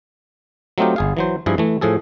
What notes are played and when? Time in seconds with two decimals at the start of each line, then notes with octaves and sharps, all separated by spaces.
0.78 F#3 A3 C4 D#4 F4 G4
0.96 G1 G#4 F5
1.17 E3 F#3 C5
1.46 G2 F3 E4 G#4
1.58 E3 A3
1.81 A2 F3 G#4 A4